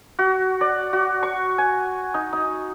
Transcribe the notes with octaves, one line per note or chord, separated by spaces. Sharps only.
F#4
D5
F#4
C#6
G#5
D#4
D#4